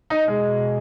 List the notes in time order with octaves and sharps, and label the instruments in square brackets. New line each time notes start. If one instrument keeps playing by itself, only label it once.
[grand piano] D#4
[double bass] B2 [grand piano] G#3